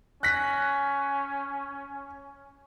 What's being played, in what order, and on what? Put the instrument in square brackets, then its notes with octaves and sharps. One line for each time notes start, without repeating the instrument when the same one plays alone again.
[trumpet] C#4 [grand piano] F#6 A#6 B6